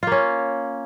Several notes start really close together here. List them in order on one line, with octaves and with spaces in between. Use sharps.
F4 A#3 C#4